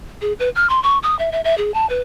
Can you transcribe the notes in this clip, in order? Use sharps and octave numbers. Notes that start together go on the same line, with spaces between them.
G#4
B4
F6
C6
C#6
D#6
E5
E5
E5
G#4
A5
B4